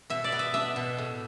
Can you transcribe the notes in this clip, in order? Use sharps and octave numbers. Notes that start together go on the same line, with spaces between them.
B2 E5
D5
B3
E5
D4 E5
B2
A2